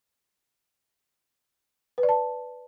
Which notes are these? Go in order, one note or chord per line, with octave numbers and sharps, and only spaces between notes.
B4
D5
A5